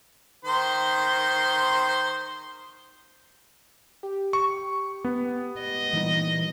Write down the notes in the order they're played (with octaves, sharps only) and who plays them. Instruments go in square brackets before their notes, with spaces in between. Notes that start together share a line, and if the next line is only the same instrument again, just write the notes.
[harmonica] D#3 C5 C6
[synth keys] G4
[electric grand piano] C#6
B3
[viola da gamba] D#5
[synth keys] A#2 G3 D#4 [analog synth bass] E3